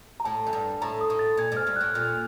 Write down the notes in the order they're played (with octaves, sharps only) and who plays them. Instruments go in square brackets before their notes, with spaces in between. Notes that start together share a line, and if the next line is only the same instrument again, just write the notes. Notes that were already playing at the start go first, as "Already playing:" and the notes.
[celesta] A#5
[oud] A2 [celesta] A5
[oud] F#2
G2
[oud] A2 [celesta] A#5
[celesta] D#6
[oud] A2
[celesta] A6
[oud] A#2 [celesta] G#6
[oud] G#2
[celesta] F6
[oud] G2
[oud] A2 [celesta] F#6
[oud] A#2 [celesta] F6